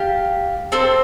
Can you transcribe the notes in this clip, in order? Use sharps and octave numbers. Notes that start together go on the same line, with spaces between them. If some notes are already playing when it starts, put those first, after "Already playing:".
Already playing: G4 F5 A5
C4 A4 C5